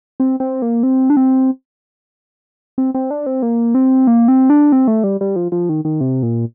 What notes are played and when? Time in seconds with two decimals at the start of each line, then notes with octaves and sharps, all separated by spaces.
0.20 C4
0.40 C4
0.62 A#3
0.83 C4
1.10 D4
1.17 C4
2.78 C4
2.95 C4
3.11 D4
3.26 C4
3.42 A#3
3.75 C4
4.07 A#3
4.28 C4
4.50 D4
4.72 C4
4.88 A3
5.04 G3
5.21 G3
5.36 F3
5.52 F3
5.69 D#3
5.85 D#3
6.01 C3
6.23 A#2